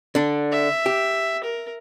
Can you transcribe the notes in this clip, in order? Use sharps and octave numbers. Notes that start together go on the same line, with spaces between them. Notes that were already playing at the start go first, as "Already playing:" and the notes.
D3 D4
E5
G4
A#4